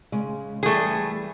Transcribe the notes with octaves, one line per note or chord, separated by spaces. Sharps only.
C#3 G#3
E3 G3 A3 G#4